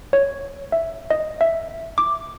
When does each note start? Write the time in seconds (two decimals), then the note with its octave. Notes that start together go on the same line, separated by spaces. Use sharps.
0.13 C#5
0.72 E5
1.10 D#5
1.41 E5
1.98 D6